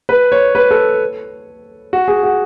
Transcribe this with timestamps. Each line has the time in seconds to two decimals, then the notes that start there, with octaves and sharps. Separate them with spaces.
0.09 B4
0.32 C#5
0.55 B4
0.71 A4
1.93 F#4
2.08 G#4
2.23 F#4